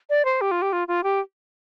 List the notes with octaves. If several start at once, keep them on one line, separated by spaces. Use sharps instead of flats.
D5
C5
G4
F4
G4
F4
F4
G4